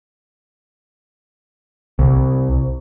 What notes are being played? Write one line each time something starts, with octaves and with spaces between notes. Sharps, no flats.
C2